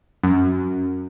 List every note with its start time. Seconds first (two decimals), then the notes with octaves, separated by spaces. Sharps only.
0.23 F#2